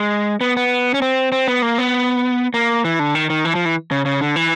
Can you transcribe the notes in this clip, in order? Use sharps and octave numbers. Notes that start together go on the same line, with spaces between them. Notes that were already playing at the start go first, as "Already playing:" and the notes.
Already playing: G#3
B3
B3
C#4
C4
C4
B3
A#3
B3
A#3
E3
D3
D#3
D#3
E3
F3
E3
C#3
C#3
D3
E3